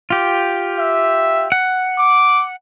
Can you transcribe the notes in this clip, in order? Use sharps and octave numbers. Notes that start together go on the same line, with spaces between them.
F4 G4
E5
F#5
D6